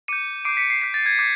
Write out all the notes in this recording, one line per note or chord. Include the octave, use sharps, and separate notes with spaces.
D6 G6 C#7 D#7
D6 G6 C7 D7
B6 C#7
C7
D6 G6 B6
A6
G#6
D6 G6 G#6